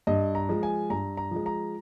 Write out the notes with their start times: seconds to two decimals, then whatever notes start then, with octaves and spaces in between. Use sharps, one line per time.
0.07 G2 D#5
0.35 A#5
0.49 F3 G#3
0.63 G#5
0.90 G2 A#5
1.17 A#5
1.31 F3 G#3
1.46 A#5